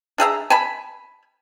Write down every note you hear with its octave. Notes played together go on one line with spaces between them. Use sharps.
D4 G#4 E5 A#5
G#5 A5 B5